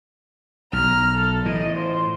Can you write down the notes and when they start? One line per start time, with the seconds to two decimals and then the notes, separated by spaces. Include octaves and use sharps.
0.73 B1 A#5 F6
1.15 A4
1.45 A2 E3 D#5
1.75 F4 C5